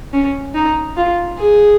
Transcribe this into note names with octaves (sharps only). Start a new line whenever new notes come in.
C#4
D#4
F4
G#4